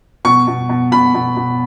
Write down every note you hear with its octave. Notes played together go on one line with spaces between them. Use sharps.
B2 C#6
B2
B2
B2 B5
B2
B2